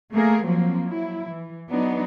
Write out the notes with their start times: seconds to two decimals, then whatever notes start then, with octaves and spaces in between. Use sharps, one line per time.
0.12 A3 A#3 G#4 A#4
0.44 F3 F#3 A#3 C4
0.84 F#3 E4
1.30 E3
1.70 F#3 B3 D4 D#4